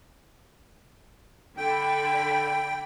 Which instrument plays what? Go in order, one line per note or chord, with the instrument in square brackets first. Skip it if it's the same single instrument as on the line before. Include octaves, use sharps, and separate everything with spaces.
[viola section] D3 B5 [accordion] G5